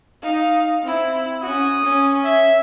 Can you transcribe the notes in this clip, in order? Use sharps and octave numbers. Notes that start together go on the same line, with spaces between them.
D#4 F5
C4 E4
C#4 F#4 D#6
C#4
E5